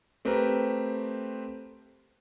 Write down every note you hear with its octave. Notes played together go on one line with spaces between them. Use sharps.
A3 C4 G4 A#4 B4